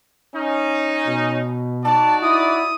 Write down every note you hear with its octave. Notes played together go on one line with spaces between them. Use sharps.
C#4 D#4
B2
D#4 F#4 D5 A5
E4 D#6